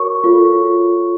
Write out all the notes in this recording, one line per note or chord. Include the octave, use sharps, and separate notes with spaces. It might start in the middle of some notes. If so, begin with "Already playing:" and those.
Already playing: F#4 A#4 C#5 C#6
F4 A4 C#5